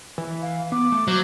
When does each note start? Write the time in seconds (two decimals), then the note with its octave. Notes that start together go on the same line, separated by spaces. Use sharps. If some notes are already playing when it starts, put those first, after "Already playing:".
0.18 E3
0.42 F5
0.72 B3 D6
0.92 A3
1.08 F#3 C5